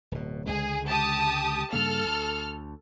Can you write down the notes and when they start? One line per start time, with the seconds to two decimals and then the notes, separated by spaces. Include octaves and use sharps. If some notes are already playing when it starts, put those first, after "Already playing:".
0.12 D1 B2
0.47 C#2 D3 G#3 G#4
0.89 G4 A5 D#6
1.73 G2 C#3 A#3 A4 F6
2.05 D2